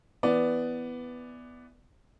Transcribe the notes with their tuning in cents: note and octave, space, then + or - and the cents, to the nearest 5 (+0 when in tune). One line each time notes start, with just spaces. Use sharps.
E3 +0 B3 +5 D5 +0